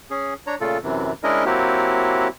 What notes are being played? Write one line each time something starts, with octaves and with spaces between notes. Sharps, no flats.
C#4 G#4
D4 C#5 A#5
A#2 C#3 A3 F4 A4
F#2 C3 E3
G#3 C#4 D4 E4 A#4 D#5
F#3 A#3 C4 E4 F#4 G4